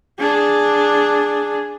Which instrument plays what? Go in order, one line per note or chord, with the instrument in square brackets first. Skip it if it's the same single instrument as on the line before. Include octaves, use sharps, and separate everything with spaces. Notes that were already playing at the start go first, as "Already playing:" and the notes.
[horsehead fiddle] D4 G#4